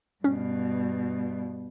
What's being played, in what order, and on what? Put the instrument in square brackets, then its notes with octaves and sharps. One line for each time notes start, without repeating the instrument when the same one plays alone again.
[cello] G2 B2 [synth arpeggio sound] C#4